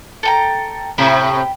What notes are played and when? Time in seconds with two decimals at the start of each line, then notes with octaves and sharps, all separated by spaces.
0.23 A4 G5 A#5
0.98 A2 C3 G5 B5